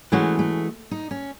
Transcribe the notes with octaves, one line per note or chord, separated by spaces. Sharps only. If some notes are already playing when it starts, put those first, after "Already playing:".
E3 G#3 A3 C#4 F#4
A3
D#4
C#4